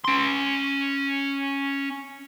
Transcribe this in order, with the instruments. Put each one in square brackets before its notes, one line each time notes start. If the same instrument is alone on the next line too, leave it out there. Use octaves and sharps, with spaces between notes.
[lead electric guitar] C#4 C6